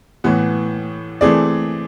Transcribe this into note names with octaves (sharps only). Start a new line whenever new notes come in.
A2 E3 B3
E3 A3 C4 G#4 D5